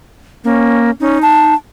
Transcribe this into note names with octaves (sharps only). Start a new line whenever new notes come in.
A#3 C#4
C#4 D#4
A5